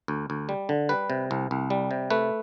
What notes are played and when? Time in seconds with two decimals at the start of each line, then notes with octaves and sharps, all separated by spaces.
0.08 D2
0.30 D2
0.49 G3
0.69 D3
0.89 G3 B4
1.10 C3
1.31 C2
1.51 C2
1.70 G3
1.91 C3
2.10 A3 B4